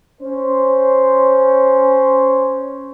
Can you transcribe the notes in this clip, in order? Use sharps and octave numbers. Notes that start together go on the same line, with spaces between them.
C#4 C5